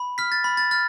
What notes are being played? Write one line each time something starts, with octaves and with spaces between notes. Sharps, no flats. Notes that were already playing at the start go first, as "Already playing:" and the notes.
Already playing: B5
F6 B6
A6
B5
A6
F6 A6